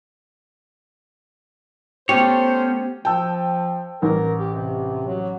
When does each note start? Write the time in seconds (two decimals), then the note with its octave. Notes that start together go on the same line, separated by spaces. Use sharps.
2.09 A3 B3 C#4 G4 C5 C#5
3.05 F3 G5 A5 E6
4.02 A1 A#4
4.39 G4
4.54 C3
5.07 F#3